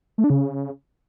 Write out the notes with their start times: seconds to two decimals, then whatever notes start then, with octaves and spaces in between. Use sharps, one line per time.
0.18 A3
0.24 D4
0.30 C#3